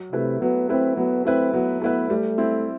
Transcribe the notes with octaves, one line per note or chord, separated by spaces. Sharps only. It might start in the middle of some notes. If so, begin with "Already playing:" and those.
Already playing: F#3
C3 A3 E4 B4
F#3 B3
A3 C4 E4 B4
F#3 B3
A3 C4 E4 B4
F#3 B3
A3 B3 E4 B4
G3 A3
C4 E4